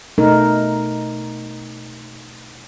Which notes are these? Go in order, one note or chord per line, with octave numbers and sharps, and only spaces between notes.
B2 A3 D#4 A#4